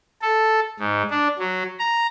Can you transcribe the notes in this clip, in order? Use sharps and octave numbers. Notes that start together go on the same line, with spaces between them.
A4
G#2
D4
F#3
A#5